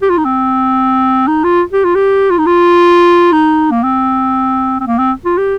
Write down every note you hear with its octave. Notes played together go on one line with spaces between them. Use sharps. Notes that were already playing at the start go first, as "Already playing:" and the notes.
G4
F4
D#4
C4
D#4
F4
G4
F4
G4
F4
D#4
F4
D#4
A#3
C4
C4
A#3
C4
F4
G4